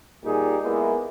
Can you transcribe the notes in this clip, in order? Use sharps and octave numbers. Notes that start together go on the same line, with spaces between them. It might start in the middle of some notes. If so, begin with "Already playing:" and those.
A#2 G3 D#4 G4 G#4
G#3 A#3 B3 E4